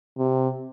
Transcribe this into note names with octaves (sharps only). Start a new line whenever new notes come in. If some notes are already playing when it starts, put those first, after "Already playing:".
C3